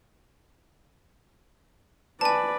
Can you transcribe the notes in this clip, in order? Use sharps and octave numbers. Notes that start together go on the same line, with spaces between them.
B4 D5 G#5 A5